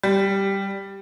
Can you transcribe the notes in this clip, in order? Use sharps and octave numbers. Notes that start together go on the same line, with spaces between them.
G3